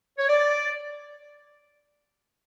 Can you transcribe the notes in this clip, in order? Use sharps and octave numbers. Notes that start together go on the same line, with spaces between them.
C#5
D5